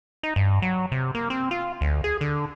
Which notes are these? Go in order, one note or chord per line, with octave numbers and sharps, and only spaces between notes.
D#4
G2
F#3
C3
A#3
C4
F4
D2
G#4
D3